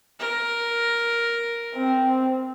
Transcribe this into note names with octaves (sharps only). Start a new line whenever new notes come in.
A#4
C4